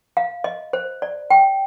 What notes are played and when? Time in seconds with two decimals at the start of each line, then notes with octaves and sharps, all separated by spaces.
0.17 F5
0.44 D#5
0.73 C5
1.02 D5
1.30 G5